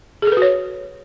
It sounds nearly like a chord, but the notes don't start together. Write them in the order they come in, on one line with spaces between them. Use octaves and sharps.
G#4 A4 B4 F#4 C#5